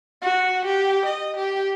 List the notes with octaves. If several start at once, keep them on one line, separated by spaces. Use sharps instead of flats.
F#4
G4
D#5
G4